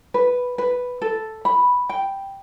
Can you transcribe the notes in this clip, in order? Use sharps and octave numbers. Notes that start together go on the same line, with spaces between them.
B4
B4
A4
B5
G5